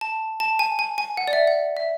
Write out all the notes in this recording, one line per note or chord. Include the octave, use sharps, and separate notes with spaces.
A5
A5
G#5
G#5
G#5
F#5
D5
E5
F#5
E5